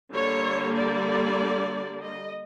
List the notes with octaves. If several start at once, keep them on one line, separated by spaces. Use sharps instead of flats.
D3 G3 A#3 C#5
D5
D#5